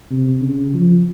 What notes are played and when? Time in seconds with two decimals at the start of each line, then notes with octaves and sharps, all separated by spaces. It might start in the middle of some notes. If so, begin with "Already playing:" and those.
0.11 C3
0.42 C#3
0.74 F3